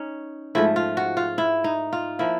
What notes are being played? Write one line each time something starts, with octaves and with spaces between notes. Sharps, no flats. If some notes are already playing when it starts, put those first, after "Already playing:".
Already playing: C#4 D#4
G#2 F3 A3 E4
F4
F#4
F4
E4
D#4
F4
F3 A#3 E4